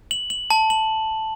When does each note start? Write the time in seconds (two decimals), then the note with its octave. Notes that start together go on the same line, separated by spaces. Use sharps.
0.11 F#7
0.30 F#7
0.50 A5
0.70 F#7